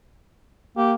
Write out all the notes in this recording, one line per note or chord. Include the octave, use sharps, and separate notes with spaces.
A#3 G4